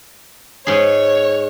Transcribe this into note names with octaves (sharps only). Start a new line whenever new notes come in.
G#2 G#4 C#5